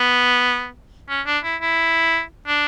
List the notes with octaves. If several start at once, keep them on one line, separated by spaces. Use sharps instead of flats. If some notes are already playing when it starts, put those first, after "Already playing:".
Already playing: B3
C#4
D4
E4
E4
D4